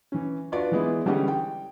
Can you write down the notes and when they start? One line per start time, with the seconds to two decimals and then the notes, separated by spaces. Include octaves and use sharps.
0.12 E3 C#4
0.52 D4 F4 F#4 B4 D5
0.72 E3 G#3 B3 E4
1.05 D3 E3 G3 G#3 C#4 G4
1.28 G5